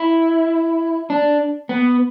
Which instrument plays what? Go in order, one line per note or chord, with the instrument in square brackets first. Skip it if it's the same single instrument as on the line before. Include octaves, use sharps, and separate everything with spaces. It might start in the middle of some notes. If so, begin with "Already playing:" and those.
Already playing: [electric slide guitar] E4
D4
B3